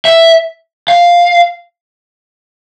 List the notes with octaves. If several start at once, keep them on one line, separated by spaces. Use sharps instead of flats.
E5
F5